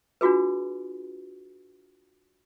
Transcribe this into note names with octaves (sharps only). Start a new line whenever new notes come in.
D4 F4 F#4 G#4 B4